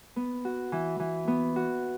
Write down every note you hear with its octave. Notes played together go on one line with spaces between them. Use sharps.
B3
F#4
E3
E3
B3
F#4